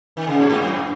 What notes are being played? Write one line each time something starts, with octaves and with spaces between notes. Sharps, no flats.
D#3
C#3
A#2
G#2
F#2